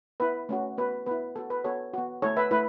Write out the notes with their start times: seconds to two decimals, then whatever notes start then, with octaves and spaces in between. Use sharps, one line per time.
0.20 B3 E4 B4
0.49 A3 C#4 F#4
0.78 B3 F#4 B4
1.06 B3 E4 B4
1.36 B3 F#4 A4
1.50 B4
1.64 B3 F#4 A4 C#5
1.93 B3 F#4
2.22 A3 E4 A4 C#5
2.37 B4 E5
2.51 A3 E4 B4